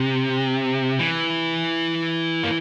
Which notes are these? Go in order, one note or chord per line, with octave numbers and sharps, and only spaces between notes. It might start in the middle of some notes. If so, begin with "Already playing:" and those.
Already playing: C3
E3
A#3